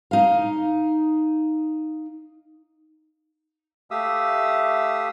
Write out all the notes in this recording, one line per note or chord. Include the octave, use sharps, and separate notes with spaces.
D#4 F5
A3 G4 E5 F5 D#6 E6